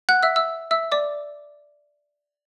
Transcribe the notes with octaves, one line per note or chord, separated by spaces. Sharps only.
F#5 F#6
E5 E6
E5 E6
E5 E6
D5 D6